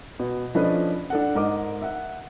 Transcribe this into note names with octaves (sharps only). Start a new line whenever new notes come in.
B2
F3 C#4 D4 A4 B4 D#5
D4 A4 F#5
G#2 A#4 D#5 D6
E5 F#5